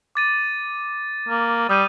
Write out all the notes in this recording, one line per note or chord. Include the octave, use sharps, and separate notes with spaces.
D6 A6 D#7
A#3
G3 D#6 G6 D#7